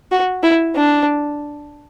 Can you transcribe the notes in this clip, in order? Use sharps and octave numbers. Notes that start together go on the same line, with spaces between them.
F#4
E4
D4